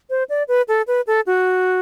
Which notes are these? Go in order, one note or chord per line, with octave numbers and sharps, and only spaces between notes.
C5
D5
B4
A4
B4
A4
F#4